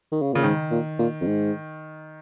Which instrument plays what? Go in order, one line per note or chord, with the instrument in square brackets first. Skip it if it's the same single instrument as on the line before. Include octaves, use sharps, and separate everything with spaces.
[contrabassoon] D#3
C#3
[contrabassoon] A#2 [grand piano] C#3
[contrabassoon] G#2 [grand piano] D#3
[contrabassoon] A#2
A#2
F2
G#2